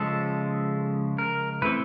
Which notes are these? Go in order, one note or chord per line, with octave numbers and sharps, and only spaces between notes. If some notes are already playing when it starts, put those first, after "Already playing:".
Already playing: C#3 F3 G#3 A4
A#4
E3 A3 C4 B4